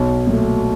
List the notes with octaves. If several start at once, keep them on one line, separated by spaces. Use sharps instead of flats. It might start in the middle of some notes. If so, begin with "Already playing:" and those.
Already playing: B1
A#2 F#3 A3